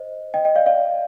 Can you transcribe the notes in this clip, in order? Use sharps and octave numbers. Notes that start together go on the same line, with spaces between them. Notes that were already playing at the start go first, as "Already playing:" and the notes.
Already playing: C5 D#5
D#5 G5
D#5 G5
D5 F5
D5 F5